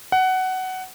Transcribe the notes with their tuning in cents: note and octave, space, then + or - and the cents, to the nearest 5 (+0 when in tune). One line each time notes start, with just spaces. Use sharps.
F#5 +15